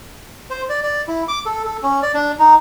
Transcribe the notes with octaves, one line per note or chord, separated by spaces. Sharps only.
C5
D5
D5
E4
D6
A4
A4
C#4
D5
D4
D#4